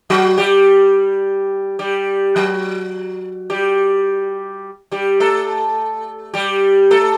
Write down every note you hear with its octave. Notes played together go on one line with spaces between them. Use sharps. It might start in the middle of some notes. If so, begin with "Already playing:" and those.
F#3 F#4
G3 G4
G3 G4
F#3 F#4
G3 G4
G3 G4
A3 A4
G3 G4
A3 A4